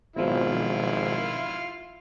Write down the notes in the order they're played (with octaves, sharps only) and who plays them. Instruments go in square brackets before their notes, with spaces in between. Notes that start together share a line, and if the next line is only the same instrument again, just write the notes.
[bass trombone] G#1 [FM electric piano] B2 F3 F#3 [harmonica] E4 F4